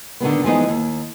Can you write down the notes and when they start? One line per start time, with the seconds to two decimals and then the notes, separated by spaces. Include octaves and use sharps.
0.20 D3 D#3 G#3 B3
0.44 E3 F3 G#3 B3 D#4
0.68 D#2